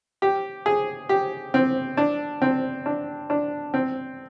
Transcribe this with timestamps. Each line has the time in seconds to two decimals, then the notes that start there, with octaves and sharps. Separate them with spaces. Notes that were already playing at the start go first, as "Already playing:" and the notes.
0.22 G4
0.66 G#4
1.09 G4
1.54 C4
1.97 D4
2.42 C4
2.86 D4
3.30 D4
3.74 C4